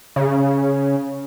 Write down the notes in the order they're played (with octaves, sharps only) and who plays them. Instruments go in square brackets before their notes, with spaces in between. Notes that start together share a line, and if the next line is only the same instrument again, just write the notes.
[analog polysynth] C#3